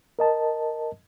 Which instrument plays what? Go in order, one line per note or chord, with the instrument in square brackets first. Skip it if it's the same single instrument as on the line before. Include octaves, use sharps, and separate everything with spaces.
[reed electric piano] A#4 D#5 A5